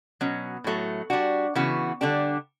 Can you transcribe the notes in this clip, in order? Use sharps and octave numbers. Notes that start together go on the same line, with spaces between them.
B2 F#3 C#4
A2 F#3 A3
G3 D4 F#4
C#3 E3 B3 F#4
D3 G3 D4 G4